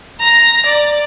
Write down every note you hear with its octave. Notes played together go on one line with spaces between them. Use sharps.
A#5
D5